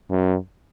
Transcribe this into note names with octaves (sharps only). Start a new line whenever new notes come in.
F#2